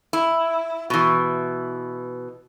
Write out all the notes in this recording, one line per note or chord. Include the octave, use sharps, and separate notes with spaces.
E4
B2 E3